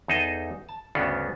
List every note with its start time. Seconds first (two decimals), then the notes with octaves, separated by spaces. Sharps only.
0.08 E2 D#4 G#4 A4 D#5
0.69 A5
0.95 D2 G2 C#3 B3 C#4 D4